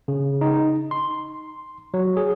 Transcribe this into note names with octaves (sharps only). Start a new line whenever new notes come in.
C#3
D#4
C6
F#3
G#4